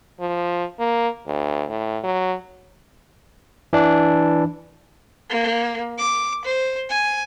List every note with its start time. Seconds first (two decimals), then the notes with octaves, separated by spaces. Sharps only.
0.20 F3
0.79 A#3
1.27 D2
1.69 A2
2.04 F#3
3.73 E3 D4
5.30 A#3
5.98 D6
6.45 C5
6.90 G#5